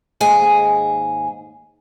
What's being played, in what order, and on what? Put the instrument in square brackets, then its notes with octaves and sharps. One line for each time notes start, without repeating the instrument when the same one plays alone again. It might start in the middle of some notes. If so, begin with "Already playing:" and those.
[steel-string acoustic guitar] D#2 G#2 G#4 G#5